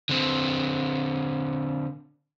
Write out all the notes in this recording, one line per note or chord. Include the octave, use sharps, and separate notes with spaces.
D3 C4